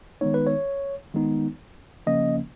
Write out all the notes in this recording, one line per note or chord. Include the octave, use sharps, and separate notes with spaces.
D#3 G#3 B3 D#4 C#5
B4
C#5
D#3 G#3 B3 D#4
C#3 F3 A#3 C#4 D#5